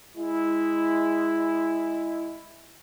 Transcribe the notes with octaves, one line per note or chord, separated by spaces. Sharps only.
G#3 E4